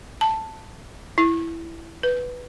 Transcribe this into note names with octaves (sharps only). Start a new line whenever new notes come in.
A5
E4
B4